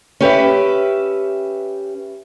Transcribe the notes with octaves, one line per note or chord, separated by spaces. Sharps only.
C#4 G4 B4 E5